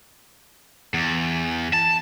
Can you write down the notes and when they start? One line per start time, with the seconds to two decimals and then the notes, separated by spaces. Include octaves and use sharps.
0.94 E2
1.73 A5